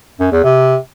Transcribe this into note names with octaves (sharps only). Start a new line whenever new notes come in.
F#2
E2
C3